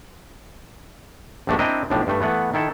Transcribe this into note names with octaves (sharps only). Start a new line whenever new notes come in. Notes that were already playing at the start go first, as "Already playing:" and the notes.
A#1 G2 A3 D4 F#4
C4 D4 E4 A#4 D#5
B1 A2 F3 D4
G2 A3
E3 A3 B3 F#5
D#3 E4 A4